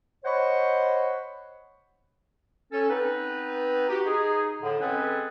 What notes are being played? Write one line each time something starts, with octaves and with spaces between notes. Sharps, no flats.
C5 C#5 D#5 F#5 B5 C#6
C#4 A4
B3 C4 D#4 B4
F#4 G4
D#4 G#4
A2 D3
G#3 C4 C#4 G#4 A4 B4